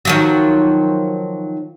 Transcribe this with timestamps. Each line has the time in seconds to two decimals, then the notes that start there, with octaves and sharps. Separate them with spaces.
0.05 D#3 F3 F#3